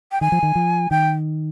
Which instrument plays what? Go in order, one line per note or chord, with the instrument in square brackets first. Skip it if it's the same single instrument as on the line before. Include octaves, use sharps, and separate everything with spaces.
[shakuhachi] G5
[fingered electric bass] D#3 [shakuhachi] G#5
[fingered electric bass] F3
D#3
F3
[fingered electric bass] D#3 [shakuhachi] G5